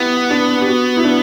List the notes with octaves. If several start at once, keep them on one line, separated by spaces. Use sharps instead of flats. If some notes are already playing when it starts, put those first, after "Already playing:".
Already playing: B3 E4 G4
D4
G4
F#4
E4
D4